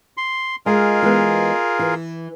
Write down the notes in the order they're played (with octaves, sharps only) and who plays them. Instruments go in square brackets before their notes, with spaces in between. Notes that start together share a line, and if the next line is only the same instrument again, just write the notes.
[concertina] C6
[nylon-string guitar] G#3 [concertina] F4 G#4 A#4
[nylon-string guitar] E3 G#3 B3
E3